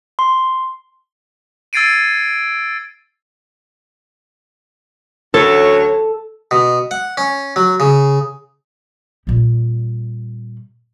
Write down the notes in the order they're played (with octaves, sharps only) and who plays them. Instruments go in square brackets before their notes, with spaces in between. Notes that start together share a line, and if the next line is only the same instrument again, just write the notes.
[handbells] C6
[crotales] E6 G#6 A6 C7 D7 D#7
[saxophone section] D2 F#3 C#5 [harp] A4
[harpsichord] B2
F#5
C#4
F#3
C#3
[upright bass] A#2 G3